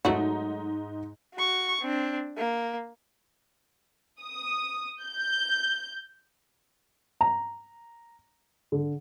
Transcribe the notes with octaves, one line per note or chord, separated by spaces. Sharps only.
G#2 F#3 A3 D#4 F#4
F#4 C#6
C4 D4
A#3
D#6
G6
A#5
D3